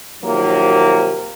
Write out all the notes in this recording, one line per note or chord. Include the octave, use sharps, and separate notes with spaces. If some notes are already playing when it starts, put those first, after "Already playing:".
C3 D#3 F3 F#3 A#3